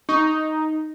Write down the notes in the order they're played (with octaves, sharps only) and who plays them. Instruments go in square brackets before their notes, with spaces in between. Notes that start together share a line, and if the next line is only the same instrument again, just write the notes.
[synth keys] D#4 [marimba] C#6